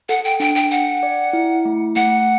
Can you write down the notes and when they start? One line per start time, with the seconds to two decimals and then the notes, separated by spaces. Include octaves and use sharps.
0.09 A4 F#5
0.25 G5
0.40 D4 G5
0.55 G5
0.71 F#5 G5
1.03 D5
1.33 E4
1.65 A3
1.96 A3 F#5